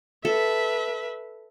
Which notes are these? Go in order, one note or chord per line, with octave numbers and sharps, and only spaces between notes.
A4 B4 E5